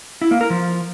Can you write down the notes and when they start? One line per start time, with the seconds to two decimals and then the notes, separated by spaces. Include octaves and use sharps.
0.22 E4
0.31 A#3
0.41 A#4
0.50 F3